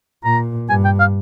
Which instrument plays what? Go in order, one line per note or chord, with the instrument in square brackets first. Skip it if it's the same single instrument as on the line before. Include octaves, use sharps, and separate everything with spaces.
[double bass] A#2 [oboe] A#5
[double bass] G2 [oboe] G#5
[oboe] G5
F5